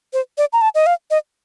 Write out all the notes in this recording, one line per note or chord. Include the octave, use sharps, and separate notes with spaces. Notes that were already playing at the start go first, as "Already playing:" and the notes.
C5
D5
A#5
A5
D#5
F5
D#5